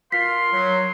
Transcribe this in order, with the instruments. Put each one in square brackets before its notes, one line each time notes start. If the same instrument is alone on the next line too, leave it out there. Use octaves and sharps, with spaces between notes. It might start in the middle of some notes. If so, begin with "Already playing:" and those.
[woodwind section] F4 A#4 F5 [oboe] C6 [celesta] B6
[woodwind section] F#3